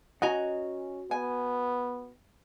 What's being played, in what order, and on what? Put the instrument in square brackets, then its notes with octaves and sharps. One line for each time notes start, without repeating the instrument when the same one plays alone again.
[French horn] C#4 [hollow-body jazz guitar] F#4 F#5 [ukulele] D#5 G#5 A#5
[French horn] B3 [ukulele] G#5